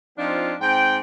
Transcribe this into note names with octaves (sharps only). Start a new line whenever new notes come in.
F3 C4 D4 D#4 F4
G#2 C4 G5